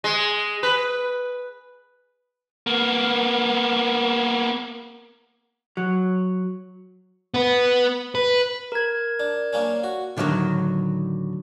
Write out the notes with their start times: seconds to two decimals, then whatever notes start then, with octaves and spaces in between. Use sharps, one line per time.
0.04 G#3
0.63 B4
2.67 A#3 B3
5.77 F#3
7.34 B3 B4
8.15 B4
8.72 A#4 G#6
9.20 D4
9.53 A#3 C#4 D4
9.84 F#4
10.17 A2 D3 D#3 F3 F#3